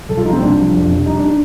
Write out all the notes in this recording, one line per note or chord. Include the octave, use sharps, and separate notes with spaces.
C2 A4
F4
F3 D#4
C4
C2 D4
F3
F2
C3
G3 D#4
D4
D4